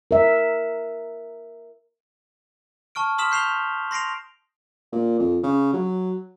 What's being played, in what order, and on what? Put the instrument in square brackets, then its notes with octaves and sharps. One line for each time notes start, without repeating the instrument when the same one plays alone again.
[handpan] A#4 E5
[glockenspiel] A5 C#6 F6 D7
C6 D#6 F6 B6 E7 F#7
C#6 G6 C7 E7 F7 G7
C6 A#6 C7 D7 F7
[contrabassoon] A#2
F2
C#3
F#3